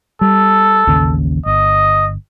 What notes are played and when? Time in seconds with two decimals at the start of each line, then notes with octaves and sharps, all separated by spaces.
0.21 G3 A4
0.87 A1 D#2 C#3
1.46 G1 D#5